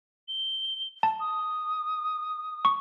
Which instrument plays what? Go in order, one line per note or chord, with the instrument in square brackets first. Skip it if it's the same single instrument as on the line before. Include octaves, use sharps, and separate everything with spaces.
[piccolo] G7
[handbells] A5
[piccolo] D#6
[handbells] C#6